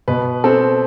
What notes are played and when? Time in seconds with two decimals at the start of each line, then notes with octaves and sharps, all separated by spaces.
0.08 B2 B4
0.44 C4 A4